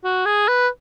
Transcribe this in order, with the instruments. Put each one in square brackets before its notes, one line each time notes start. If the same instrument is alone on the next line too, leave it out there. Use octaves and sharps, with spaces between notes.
[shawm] F#4
G#4
B4